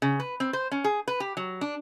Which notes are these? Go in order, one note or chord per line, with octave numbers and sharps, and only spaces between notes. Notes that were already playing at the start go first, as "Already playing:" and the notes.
C#3
B4
C4
C5
C#4
G#4
B4
G4
F#3
D4